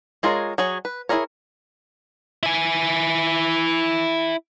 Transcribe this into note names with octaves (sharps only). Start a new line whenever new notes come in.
G#3 F4 G#4 A#4 C#5
F#3 G#4 C#5
B4
E4 F4 G#4 A#4 C#5
E4 G#5